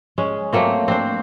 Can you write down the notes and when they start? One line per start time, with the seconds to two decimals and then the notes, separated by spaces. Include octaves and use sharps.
0.18 G#3 C#4
0.53 F#3 A3 A#3 C4
0.88 C4 D4 C5